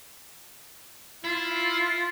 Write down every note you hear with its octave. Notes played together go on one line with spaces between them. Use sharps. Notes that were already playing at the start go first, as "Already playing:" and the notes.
E4 F4